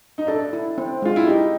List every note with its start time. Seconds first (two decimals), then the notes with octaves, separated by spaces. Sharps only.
0.18 D#4
0.27 D4 A4
0.53 E4
0.78 C4
1.02 G#3 F4
1.16 E4
1.27 D#4 G4